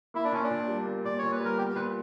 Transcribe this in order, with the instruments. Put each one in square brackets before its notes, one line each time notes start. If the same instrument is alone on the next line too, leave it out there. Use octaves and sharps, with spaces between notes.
[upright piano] A#3 [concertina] E4
[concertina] D4
[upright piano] A#2 [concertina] C#4
[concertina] D4
[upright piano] A#2
G3
A#3
[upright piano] A#2 [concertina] D5
[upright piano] A#2 [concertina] C#5
[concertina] B4
[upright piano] G3
[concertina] A#4
[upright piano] B3 [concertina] G4
[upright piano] A#2 [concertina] B4